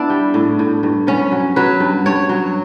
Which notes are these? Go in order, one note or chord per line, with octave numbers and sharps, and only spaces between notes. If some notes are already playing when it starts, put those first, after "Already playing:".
Already playing: B3 D4 E4
G3
A2
A2
G2
B3 C#4
F#3
F#3 B4
G2
G2 C#5
F#3